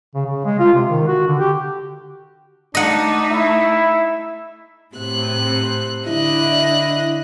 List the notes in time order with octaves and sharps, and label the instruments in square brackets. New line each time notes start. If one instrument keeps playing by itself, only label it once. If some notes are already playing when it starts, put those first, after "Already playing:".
[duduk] C#3
C#3
G#3
F4
C3
D#3
F#4
D3
G4
[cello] A3 D#4 [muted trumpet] D4 [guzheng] D#5 F#5
[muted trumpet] E4 [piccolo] E5
[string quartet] A2 C3 F#6
[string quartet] D3 D#5 F#6 [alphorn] E4